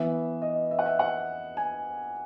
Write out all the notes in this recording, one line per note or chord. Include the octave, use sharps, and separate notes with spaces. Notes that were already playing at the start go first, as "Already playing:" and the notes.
Already playing: E3 B3 E5
D#5
E5
F#5
E5
F#5
G#5